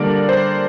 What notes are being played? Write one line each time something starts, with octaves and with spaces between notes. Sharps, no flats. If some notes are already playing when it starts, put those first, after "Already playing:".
Already playing: D3 G3 A#3 A#4 D5
C5